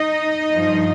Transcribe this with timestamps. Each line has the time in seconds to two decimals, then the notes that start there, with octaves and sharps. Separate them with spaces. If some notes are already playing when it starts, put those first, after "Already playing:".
Already playing: D#4 D#5
0.51 G2 F3